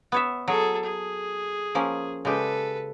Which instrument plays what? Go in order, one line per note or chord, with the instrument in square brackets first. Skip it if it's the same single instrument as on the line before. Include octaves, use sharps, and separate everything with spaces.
[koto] B3 C#5 E5
[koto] F#3 [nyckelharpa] G#4 A4
[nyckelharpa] G#4
[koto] F3 A#3 C#4
[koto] C#3 G#3 G4 [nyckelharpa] A4 B4